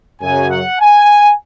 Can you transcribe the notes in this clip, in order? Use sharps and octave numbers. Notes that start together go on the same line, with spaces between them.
F#2 C#3 F#3 G#5
F#5
G#5